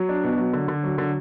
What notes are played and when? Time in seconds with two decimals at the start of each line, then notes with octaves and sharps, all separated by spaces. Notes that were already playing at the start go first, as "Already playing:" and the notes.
Already playing: F#3
0.09 D4
0.24 B2
0.38 F#3
0.53 D3
0.68 D3
0.83 F#3
0.98 D3